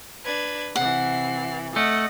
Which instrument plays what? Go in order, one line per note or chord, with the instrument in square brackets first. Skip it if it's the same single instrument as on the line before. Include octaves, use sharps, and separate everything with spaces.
[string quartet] D4 [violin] B4 G#6
[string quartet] C3 E3 [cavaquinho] F#5 [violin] C7
[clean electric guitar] A3 [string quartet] D#5 [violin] F#5